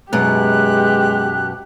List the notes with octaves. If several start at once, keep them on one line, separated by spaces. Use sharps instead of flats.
F#2 B2 G#3 B3 G4 F#6